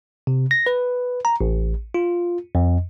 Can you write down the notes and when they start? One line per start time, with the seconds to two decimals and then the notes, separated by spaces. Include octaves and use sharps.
0.27 C3
0.51 A#6
0.67 B4
1.25 A#5
1.41 A1
1.94 F4
2.55 F2